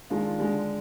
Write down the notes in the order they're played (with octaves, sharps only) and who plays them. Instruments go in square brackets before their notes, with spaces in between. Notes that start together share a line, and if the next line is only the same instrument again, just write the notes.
[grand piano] D#3 G#3 D4 F4
D3 G#3 D4